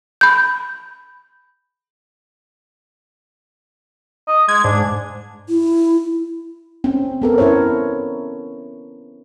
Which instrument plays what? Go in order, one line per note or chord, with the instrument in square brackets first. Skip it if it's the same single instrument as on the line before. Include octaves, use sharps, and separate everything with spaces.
[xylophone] B5 G6
[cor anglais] D#5
[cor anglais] G#3 [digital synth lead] G#6
[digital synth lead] G#2 [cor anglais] D4
[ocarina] E4
[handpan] C4 C#4
B3 A4 A#4
C#4 E4 A#4 C5 C#5